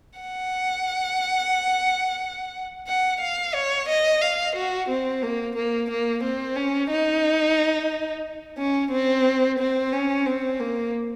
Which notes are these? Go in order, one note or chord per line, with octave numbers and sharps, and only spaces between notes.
F#5
F#5
F5
C#5
D#5
F5
F#4
C4
A#3
A#3
A#3
C4
C#4
D#4
C#4
C4
C4
C#4
C4
A#3